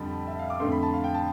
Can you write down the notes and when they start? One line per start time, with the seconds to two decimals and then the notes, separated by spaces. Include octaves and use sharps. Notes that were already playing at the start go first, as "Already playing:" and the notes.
Already playing: F2 D3 G3 A5 B5
0.27 E5
0.39 F5
0.50 D6
0.60 F2 D3 A3 C6
0.72 B5
0.83 A5
0.94 F5
1.04 G5
1.14 A5